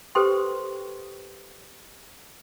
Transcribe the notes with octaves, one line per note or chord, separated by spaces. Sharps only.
G4 A4 B4 C5 G5 C6